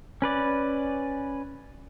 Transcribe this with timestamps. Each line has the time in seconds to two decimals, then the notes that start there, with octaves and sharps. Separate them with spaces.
0.22 C#4 B4 D5